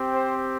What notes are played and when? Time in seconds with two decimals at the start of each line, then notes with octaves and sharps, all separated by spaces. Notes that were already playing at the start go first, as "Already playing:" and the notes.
Already playing: C4 G4
0.14 C5